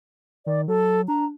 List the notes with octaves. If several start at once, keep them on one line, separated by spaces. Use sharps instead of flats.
D#3 D5
F#3 A4
D4 A#5